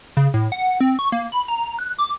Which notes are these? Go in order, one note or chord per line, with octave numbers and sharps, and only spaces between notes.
C#3
A2
F#5
C4
C#6
A#3
B5
A#5
F#6
D6